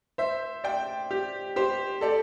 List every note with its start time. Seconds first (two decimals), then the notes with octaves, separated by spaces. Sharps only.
0.18 C5 E5
0.64 D5 G5
1.11 G4
1.56 G4 C5
2.01 A4 D5